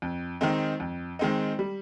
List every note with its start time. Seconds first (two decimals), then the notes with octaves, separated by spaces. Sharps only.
0.02 F2
0.41 D#3 G#3 C4 D#4
0.80 F2
1.19 D#3 G#3 C4 D#4
1.59 G3